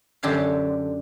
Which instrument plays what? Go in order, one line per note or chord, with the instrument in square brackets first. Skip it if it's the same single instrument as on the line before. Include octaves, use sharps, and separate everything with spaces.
[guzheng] F#2 D3 D4 G4 C#5 F5